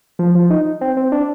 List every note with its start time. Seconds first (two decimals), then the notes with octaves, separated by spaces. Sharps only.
0.19 F3
0.35 F3
0.50 D#4
0.81 C4
0.97 C4
1.12 D4